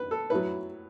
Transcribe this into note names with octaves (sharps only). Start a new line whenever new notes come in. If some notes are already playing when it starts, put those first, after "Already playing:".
Already playing: B4
A4
A2 F#3 B4